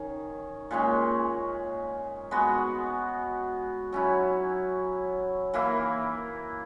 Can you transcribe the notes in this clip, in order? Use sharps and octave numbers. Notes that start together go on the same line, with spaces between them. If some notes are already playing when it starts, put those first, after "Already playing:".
Already playing: D#3 C#4
A#2 G#3 C#4
G#3 B3 F#4
F#3 C#4 E4
E3 A#3 E4